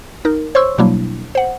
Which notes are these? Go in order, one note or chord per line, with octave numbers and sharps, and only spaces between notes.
D#4 A#4
C5 C#5 C6 C#6 E6
B2 F#3 G3 A#3 D4 E4
C5 F#5